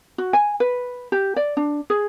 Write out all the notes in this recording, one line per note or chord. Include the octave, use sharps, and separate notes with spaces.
F#4
G#5
B4
G4
D5
D4
G#4